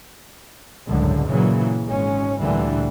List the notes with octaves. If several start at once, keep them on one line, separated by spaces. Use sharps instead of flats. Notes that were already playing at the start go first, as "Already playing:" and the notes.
G1 C#2 F#2 A2 D3
A#2 C#3 E3 F#3
G#1 G#3 C#4
D2 A#2 D3 E3 G3